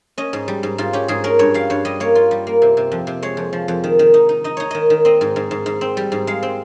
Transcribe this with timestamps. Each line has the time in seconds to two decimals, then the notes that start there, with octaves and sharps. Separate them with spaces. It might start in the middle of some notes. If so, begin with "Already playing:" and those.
0.18 C#4 D#5
0.33 G#2
0.48 G3
0.63 G#2
0.78 G#2 F4
0.93 C#4 G4
1.08 G#2 G#4
1.24 C#4 A#4
1.39 G2 C#5
1.54 G3 F5
1.70 G2 C#5
1.85 G3 D#5
2.00 A#3 C#5
2.15 F4
2.31 G3
2.47 A#3
2.62 C3
2.77 C3
2.92 F2
3.07 C3
3.22 G#3 C#5
3.37 F2
3.53 F3
3.68 F2
3.84 D#3
3.99 D#3
4.14 D#4
4.29 D#4
4.44 D#4 D#5
4.57 D#4 C#5
4.71 D#3 D#5
4.90 D#3
5.05 C4 D#5
5.21 G#2
5.36 G#2
5.51 G#2
5.66 G#2
5.81 C4
5.97 G3
6.12 G#2
6.27 G#3 F5
6.43 C4